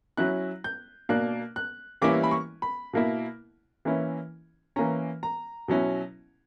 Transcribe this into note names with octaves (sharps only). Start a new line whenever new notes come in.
F#3 C#4 E4 F#6
G6
B2 A#3 D4 F#6
F#6
E3 G3 A#3 C#4 E4 D6
B5
C#6
B5
B2 A#3 E4
E3 A#3 C#4 E4
E3 A#3 C#4 A#5
A#5
B2 F#3 C#4 E4